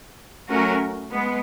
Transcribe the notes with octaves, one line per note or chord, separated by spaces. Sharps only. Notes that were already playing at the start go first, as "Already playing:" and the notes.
F#3 A3 C#4 F#4 A#4
G#3 B3